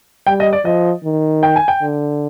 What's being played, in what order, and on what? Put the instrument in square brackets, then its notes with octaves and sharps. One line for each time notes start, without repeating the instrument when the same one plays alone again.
[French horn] G3 [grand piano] G5
[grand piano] D#5
D5
[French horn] F3 [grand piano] D#5
[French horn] D#3
[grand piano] G5
G#5
G5
[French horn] D3